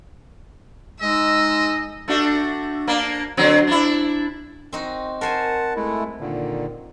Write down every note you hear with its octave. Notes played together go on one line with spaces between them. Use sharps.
G#3 D#4 D#5 E6
A3 D4 F#4
A#3 D4
D3 F#3 C4
D4 E4
C4 D#4 F#4
A#4 C5 F#5 G#5 A5
G#3 A3 E4
A#2 D3 D#3